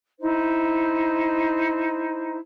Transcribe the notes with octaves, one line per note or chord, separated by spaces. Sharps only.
D#4 E4 C5